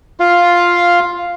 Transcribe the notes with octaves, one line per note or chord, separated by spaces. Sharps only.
F4 F5